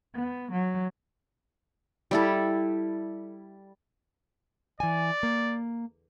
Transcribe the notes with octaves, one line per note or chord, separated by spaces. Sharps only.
B3
F#3
G3 E4 A4
E3 D5 G#5
A#3